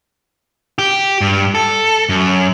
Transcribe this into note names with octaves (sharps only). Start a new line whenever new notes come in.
G4
G2
A4
F#2